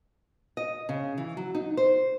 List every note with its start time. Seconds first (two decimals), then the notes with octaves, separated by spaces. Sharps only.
0.57 D#5
0.89 C#3
1.18 E3
1.37 F#3
1.55 D#4
1.77 C5